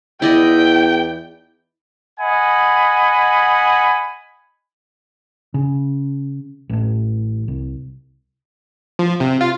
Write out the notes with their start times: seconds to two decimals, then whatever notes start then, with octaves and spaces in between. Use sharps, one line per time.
0.22 E2 E4 D5 D#5 G5
2.18 D#5 F#5 G#5 B5
5.54 C#3
6.69 A1 A2
7.48 C2
8.99 F3
9.20 C3
9.41 F4